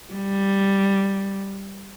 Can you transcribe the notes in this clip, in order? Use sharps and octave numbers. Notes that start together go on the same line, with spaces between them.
G3